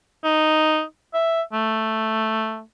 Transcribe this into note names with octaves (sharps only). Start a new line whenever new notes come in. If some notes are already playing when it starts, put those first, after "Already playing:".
D#4
E5
A3